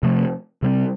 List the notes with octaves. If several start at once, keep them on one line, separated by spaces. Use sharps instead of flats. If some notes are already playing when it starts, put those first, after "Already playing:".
C3 F3 A3
C3 G3 C4